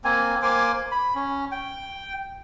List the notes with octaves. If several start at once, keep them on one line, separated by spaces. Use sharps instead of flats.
A#3 C4 G#5
A#3 C5 G#5 D6
B5
C#4
G5